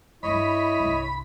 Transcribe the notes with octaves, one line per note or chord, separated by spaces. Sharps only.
G2 G3 E4 C#5 D#5 B5
C2 G2